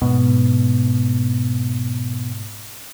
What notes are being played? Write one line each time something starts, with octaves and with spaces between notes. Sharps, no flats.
G#2 B2